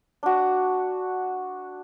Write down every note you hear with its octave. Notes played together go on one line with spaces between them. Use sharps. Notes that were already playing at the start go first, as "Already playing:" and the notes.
D4 F#4